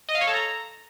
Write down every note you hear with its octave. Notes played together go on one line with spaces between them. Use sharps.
D#5
F5
C#5
A4
A#5